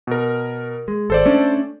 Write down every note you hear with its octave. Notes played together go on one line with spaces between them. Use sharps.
B2 A#4
G#3
G#1 A4 C5 D5
A3 C#4 D4